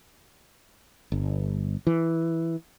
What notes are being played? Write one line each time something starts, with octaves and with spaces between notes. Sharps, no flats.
G1
E3